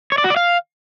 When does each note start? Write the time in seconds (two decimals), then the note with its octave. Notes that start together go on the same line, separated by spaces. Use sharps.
0.12 C#5
0.18 D5
0.24 F#4
0.30 D5
0.36 F5